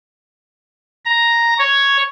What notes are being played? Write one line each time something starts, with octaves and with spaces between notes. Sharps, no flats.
A#5
C#5